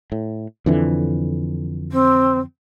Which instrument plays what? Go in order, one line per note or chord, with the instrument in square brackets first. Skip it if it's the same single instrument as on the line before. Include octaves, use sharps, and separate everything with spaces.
[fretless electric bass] A2
F2 D3 E3
[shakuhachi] C4